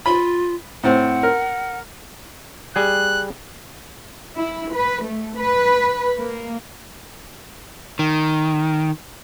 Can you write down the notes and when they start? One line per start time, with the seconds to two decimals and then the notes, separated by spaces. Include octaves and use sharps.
0.06 F4 B5
0.84 A2 C4 F#5
1.23 A#4
2.76 G3 G#4 F#6
4.37 E4
4.73 B4
5.04 A3
5.36 B4
6.18 A#3
7.99 D#3